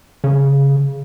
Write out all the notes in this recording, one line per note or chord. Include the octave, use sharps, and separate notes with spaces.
C#3